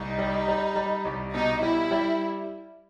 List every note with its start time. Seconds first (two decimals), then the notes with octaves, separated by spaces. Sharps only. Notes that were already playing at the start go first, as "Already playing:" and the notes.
Already playing: C2 D#4
0.18 G3
0.48 G3
0.76 G3
1.05 C2
1.33 B2 D#4
1.62 G3 E4
1.91 G3